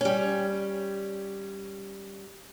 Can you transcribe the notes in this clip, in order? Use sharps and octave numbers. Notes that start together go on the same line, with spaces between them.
G3 C#4